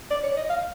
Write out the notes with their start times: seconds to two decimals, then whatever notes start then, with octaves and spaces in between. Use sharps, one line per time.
0.10 D5
0.24 C#5
0.37 D#5
0.50 F5